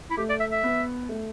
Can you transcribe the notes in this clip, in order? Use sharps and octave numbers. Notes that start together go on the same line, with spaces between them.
E4
A3 G4
D5
E5
E5
B3
A3